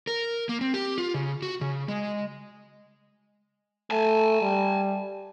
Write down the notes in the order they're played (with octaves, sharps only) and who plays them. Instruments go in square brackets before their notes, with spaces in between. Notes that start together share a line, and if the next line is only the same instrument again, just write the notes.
[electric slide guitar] A#4
A#3
C4
G4
F4
C#3
F#4
C#3
G#3
[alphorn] A3 [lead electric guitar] G#5 A5
[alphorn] G3